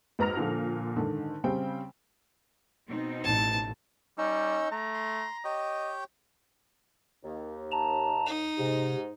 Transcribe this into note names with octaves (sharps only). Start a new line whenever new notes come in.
G#1 B4 A#5 F6 A#6 F7
A#2 D3 F3
G#2 D3 D#3
C#3 G3 C4 G5
B2 C4 D#4
A1 A5
G3 C#4 D#4 C#5 E6
A3 A#5
C6
G4 C#5 D#5 G5
D#2
A5 A#5
D#4
G#2 C3